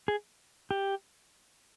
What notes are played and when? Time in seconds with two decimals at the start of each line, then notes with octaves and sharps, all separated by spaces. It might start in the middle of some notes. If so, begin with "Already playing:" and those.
0.08 G#4
0.71 G4